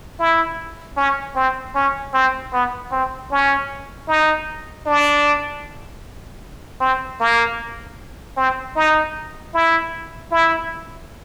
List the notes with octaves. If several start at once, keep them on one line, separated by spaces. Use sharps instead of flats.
E4
C#4
C4
C#4
C4
B3
C4
C#4
D#4
D4
C4
A#3
C4
D#4
E4
E4